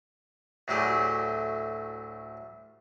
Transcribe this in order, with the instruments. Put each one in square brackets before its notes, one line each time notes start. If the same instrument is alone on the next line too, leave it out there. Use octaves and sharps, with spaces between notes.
[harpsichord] D2 A2 F#3 G4 G#4